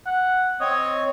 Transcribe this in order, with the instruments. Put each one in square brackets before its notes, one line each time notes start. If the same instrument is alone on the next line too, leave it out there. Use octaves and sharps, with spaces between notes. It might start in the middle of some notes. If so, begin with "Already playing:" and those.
[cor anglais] F#5
[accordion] C4 C#5 [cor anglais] D#5